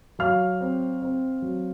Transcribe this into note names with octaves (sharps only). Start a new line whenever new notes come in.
F#3 F5 F6
C4
C4
F#3